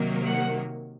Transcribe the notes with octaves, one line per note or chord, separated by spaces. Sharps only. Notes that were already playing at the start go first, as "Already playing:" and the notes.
Already playing: C3 D#3 F#3 A#3
F#5